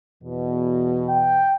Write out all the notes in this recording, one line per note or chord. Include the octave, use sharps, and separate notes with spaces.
E2 B2
G5